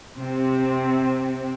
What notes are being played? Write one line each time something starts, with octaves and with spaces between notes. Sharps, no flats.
C3 C4